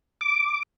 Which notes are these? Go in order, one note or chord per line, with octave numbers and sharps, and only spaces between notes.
D6